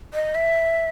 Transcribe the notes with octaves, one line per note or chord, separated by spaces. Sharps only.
D#5
E5